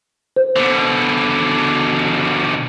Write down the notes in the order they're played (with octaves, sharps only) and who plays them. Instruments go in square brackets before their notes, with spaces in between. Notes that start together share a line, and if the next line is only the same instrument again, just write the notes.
[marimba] C5
[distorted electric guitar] B2 D3